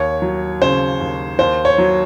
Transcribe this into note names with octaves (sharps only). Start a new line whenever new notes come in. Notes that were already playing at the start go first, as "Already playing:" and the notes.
Already playing: D#2 C#5
F#3
C#3 C5
D#2
D#2 C5
C#5
F#3